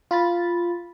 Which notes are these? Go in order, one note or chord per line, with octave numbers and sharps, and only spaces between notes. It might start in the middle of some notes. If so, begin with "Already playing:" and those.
F4 B5 A6